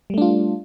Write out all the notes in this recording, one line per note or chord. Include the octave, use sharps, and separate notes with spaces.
G3 A3 D4 F4